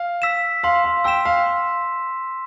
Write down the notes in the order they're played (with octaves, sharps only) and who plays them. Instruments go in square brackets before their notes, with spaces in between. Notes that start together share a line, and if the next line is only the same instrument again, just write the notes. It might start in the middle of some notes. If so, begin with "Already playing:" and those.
Already playing: [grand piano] F5
[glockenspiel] E6 B6 E7
[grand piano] F5 [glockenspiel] C6
[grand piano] F5
[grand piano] G5 [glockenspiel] E6 B6 E7
[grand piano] F5
[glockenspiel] C6